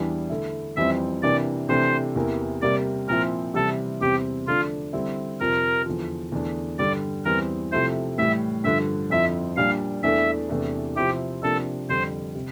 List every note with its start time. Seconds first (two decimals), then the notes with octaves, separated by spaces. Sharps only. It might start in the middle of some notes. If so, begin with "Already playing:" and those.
Already playing: E2 E3 G3 D4
0.30 D3 A3 E4
0.77 F2 E3 G3 C4 E5
1.22 C3 E3 A#3 D4 D5
1.69 C3 E3 A3 D4 C5
2.16 E2 C3 E3 A#3 E4
2.62 C3 G3 A#3 D5
3.08 A#2 F3 C4 E4 A#4
3.54 C3 E3 G3 C4 E4 A4
4.01 E2 C3 G3 C4 G4
4.47 D3 F3 A3 D4 F4
4.93 D3 G3 C4 E4
5.40 F2 C3 F3 A#4
5.86 E2 D3 F3
6.32 E2 D3 A3 D4
6.78 G2 D3 G3 D5
7.25 E2 E3 G3 C4 A#4
7.72 C3 F3 A3 E4 C5
8.18 A2 E3 G3 E5
8.64 G2 D3 F3 E5
9.10 F2 D3 F3 C4 E4 E5
9.57 A#2 G3 D4 F5
10.03 E2 E3 A3 D4 E5
10.49 E2 C3 E3 A3 D4
10.96 C3 F3 C4 E4 G4
11.42 C3 F3 A#3 D4 A4
11.89 F2 D3 G3 C5
12.35 C3